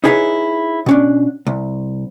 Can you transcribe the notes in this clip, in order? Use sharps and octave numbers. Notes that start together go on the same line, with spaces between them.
D#4 E4 G#4 A4 B4 C#5
B2 C#4 D4
C2